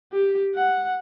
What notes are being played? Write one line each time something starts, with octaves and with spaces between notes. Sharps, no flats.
G4
F#5